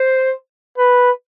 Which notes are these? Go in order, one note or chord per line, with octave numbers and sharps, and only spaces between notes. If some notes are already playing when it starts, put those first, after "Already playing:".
Already playing: C5
B4